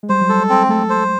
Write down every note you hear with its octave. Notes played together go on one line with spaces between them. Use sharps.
G#3
G3 C5
F#3
G3 A4
G#3
C4
G#3
A3 A4
C5